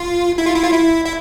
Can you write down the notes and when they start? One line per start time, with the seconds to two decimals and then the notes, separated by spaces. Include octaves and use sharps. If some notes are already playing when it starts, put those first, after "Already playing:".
Already playing: F4
0.38 E4
0.46 F4
0.55 E4
0.63 F4
0.72 E4
1.06 E4